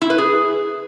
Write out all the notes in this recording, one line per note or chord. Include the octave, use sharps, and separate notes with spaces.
E4
B4
G#4